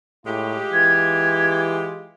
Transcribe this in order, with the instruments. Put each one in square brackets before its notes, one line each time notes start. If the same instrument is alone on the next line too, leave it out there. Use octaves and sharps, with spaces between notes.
[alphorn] A2 [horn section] G#3 F4 G4
[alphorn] E3 [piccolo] G#6